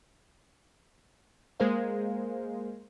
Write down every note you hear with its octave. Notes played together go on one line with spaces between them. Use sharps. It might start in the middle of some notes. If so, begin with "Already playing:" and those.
G#3 A#3 G#4 A#4 C5 F5